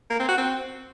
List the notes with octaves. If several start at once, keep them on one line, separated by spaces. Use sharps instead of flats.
A#3
C4
F#4
C4